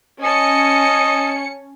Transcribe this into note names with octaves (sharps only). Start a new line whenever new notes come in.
C#4 D#5 G#5 A5 C#7